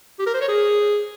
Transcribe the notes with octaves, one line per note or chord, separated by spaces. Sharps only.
G4
A#4
C5
C#5
G#4